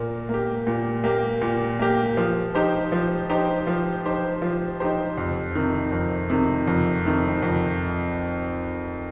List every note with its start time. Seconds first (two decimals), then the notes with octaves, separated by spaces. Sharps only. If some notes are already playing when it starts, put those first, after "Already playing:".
Already playing: A#2 A#3
0.29 A#3 G4
0.67 A#2
1.04 A#3 G4
1.42 A#2
1.80 A#3 G4
2.17 F3
2.55 D#4 G4 C5
2.92 F3
3.29 D#4 G4 C5
3.67 F3
4.05 D#4 G4 C5
4.42 F3
4.80 D#4 G4 C5
5.17 F2
5.55 C3 D#3
5.92 F2
6.30 C3 D#3
6.67 F2
7.05 C3 D#3
7.42 F2